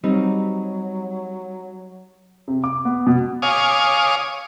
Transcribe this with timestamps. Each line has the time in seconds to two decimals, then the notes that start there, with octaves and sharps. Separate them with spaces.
0.04 F#3 G3 C4 D#4
2.48 C3
2.64 D6
2.85 B3
3.07 B2
3.42 C#5 F5 G#5 D6 D#6